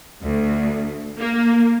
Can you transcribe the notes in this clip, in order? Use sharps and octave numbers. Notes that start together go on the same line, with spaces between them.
D2
A#3